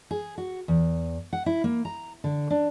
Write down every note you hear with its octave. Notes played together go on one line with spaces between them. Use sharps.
G#4
F#4
E2
F#5
E4
A#3
A#5
D3
D4